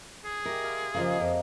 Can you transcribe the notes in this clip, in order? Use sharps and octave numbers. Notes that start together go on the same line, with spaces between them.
G#4
G4 A#4 E5
G4 F5 C6
C#3 E3 F3 A#3 D#5
F2